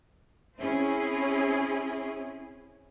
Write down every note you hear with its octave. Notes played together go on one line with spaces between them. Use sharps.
C4 C#4 E4 G#4